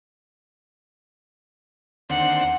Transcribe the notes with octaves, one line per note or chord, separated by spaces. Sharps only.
D#2 D3 C4 F#5